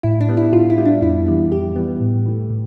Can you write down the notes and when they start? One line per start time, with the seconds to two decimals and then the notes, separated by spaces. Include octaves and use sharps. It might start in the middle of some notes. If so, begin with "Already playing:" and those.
0.03 A2 E4
0.21 D4
0.29 G3 B3
0.37 E4
0.53 A2 F4
0.70 E4
0.78 G3 B3
0.85 D4
1.02 F2 E4
1.26 E3 G3 B3
1.52 F2 G4
1.76 E3 G3 B3
2.00 A2
2.26 E3 A3
2.50 A2